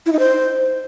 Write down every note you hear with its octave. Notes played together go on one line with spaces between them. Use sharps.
E4
D#4
C5